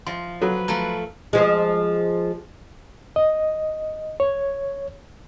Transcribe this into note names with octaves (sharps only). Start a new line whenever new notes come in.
F3 E5 C6
F#3 A4 B4
F3 A3 A#5
F3 G#3
D#5
C#5